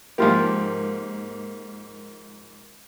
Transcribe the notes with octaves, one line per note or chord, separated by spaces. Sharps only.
G#2 F3 A#3 F4 G4